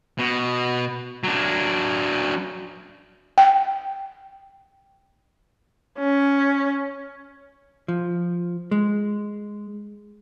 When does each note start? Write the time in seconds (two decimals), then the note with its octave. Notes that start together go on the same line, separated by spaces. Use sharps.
0.19 B2
1.24 F#3 D4
3.38 G5
5.99 C#4
7.88 F3
8.71 G#3